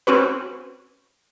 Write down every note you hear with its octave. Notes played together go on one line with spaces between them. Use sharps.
C4 C#4 F#4 B4